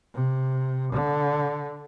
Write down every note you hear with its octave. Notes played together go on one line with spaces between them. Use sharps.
C3
D3